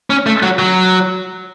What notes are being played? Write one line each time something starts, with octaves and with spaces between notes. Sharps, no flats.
C#4
A3
F#3
F#3